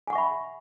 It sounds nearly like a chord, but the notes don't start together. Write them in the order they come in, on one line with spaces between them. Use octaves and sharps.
G#5 F#5 C#6 E5 B5